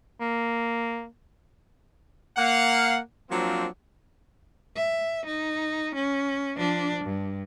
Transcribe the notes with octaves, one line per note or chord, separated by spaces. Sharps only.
A#3
A#3 F5 F#5
F3 F#3 A#3 C4 D4 F4
E5
D#4
C#4
F3 D4
G2